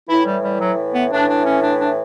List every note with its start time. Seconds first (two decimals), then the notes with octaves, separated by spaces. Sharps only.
0.09 A2 E3 E4
0.26 G3
0.44 G3
0.61 F#3
0.95 B3
1.12 A2 E3 D4
1.29 D4
1.46 C#4
1.63 D4
1.80 D4